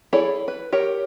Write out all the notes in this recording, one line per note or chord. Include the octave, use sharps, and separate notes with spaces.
E4 G#4 A4 C#5 D5
B4
G4 A#4 C#5